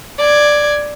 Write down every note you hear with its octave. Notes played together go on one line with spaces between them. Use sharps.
D5 G#6